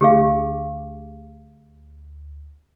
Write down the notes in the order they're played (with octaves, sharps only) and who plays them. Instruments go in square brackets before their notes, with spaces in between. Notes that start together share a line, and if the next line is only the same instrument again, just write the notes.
[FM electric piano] D2 [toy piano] G4 G#4 F5